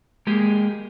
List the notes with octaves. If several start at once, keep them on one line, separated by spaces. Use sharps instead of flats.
G#3 A#3 G4 G#4